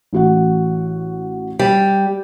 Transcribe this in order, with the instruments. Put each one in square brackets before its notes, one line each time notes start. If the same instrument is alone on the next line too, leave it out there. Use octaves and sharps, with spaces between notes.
[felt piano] A1 F#4 F#5
[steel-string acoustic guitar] G3